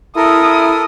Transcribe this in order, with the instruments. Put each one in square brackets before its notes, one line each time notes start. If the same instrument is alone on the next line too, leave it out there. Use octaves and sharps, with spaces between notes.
[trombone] E4 [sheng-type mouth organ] A4 A#4 [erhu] D#6